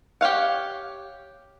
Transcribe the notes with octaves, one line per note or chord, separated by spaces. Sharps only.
G4 C#5 F5 F#5